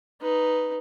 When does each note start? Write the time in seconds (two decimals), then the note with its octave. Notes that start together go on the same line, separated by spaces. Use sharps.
0.21 D#4 B4